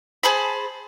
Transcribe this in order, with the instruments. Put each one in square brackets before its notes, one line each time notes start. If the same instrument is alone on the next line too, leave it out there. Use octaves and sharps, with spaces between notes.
[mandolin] G#4 C5 A5 B5